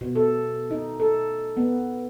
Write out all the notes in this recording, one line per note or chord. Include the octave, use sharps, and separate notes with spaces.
B2
A4
D#4
A4
B3